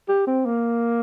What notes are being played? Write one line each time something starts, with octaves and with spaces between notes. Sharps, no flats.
G4
C4
A#3